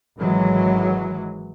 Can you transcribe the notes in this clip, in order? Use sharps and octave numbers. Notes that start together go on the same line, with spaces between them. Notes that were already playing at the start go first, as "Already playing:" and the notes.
G#1 E3 F#3 G#3